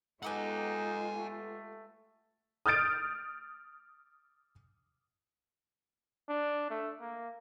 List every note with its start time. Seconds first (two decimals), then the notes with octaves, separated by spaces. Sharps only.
0.23 G#3 B3 D#4 F4 G4 A4 F#5 G#5
1.15 A3
2.66 D#6 F6 G6 A6 D7
6.29 D4
6.70 A3
7.01 A#3